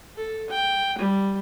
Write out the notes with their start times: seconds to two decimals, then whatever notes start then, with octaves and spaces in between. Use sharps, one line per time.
0.18 A4
0.51 G5
0.99 G3